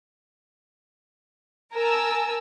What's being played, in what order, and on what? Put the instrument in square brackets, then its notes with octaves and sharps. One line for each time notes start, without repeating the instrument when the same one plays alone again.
[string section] A#4 G#5 A5 E6